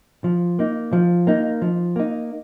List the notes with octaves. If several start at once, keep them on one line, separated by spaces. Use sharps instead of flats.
F3
A#3 D#4
F3
A#3 D#4
F3
A#3 D#4